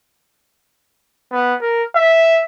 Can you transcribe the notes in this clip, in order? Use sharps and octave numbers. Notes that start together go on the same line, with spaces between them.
B3
A#4
E5